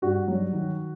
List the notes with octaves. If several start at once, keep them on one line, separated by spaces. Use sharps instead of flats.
G2 F#4
F#3
D#3